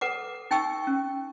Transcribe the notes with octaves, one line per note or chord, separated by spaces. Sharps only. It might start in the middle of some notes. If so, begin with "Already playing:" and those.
A4 B4 F#5 D6
D#4 G5 G#5 C#6 E6
C#4